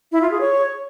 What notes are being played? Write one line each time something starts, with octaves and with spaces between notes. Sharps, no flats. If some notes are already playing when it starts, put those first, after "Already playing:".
E4
F4
G#4
C#5